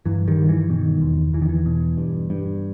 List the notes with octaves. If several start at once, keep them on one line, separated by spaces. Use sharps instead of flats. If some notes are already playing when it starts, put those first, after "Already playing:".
G2 E3
D#3 G3
G2
E3
B2 D#3
E2
E2 E3
D#3
E3
B2
G2
G2